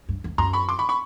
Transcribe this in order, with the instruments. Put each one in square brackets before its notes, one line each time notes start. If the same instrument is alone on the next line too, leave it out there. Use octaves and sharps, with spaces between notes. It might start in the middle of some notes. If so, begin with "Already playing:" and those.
[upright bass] G2
F2
[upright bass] F#2 [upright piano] A#5 C6
[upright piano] B5 C#6
C6 D6
B5 C#6
B5 C#6